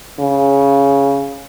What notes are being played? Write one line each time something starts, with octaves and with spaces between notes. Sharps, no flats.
C#3